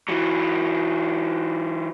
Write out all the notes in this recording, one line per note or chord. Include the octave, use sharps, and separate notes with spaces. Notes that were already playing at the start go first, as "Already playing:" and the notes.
E3 F#3